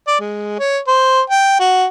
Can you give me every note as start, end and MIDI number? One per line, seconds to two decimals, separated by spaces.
0.07 0.16 74
0.20 0.59 56
0.59 0.78 73
0.88 1.20 72
1.30 1.58 79
1.60 1.86 66